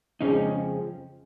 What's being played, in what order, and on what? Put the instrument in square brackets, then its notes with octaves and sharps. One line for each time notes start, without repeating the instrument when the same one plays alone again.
[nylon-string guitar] F2 C#3 F3 G#3 C4 [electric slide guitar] C#4 D#4